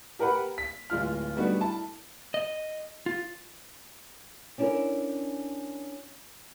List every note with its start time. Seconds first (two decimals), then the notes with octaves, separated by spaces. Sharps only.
0.19 G4 A#4 B4 F#5 B5
0.58 B6
0.90 D1 G#3 F4 F6
1.37 G3 A3 B3 D4 D#4 F#4
1.60 E4 A5
2.34 D#5
3.06 F4
4.58 C#4 D4 E4 G4 A4 A#4